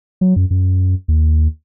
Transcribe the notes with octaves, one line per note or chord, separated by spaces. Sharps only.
F#3
F#2
F#2
D#2